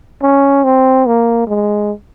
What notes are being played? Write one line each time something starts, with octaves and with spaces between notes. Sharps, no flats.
C#4
C4
A#3
G#3